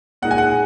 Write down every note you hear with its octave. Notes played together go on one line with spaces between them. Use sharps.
A#2 G#3 D#4 F#5
G#5
F#5